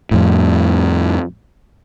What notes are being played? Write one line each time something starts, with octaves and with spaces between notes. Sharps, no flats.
F2 A2